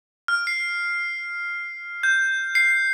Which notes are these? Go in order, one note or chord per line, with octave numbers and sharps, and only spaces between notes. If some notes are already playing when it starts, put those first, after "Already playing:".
F6
C7
G6
C7